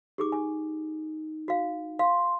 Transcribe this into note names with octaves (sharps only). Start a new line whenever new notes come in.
D#4 G4 G#4 D6
G#5
F#4 F5
F5 C6